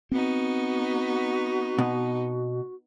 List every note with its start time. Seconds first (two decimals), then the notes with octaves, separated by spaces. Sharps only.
0.12 B3 C4 D#4 F#4
1.78 B2